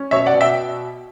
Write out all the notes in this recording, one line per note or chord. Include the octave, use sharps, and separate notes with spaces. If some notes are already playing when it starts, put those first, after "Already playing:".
Already playing: C#4
B2 C#5 E5
D5 F#5
B2
E5 G5